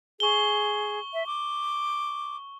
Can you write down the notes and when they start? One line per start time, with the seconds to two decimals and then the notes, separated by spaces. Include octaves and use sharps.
0.20 G#4 C#6 G7
1.14 E5
1.26 D6